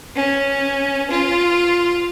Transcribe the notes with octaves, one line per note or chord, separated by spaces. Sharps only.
C#4
F4